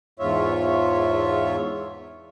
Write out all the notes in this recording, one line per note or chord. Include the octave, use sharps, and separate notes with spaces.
E2 G#2 F4 C#5 E5